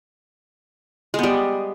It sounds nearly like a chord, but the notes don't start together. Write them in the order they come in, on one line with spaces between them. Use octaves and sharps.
G#3 B3 G3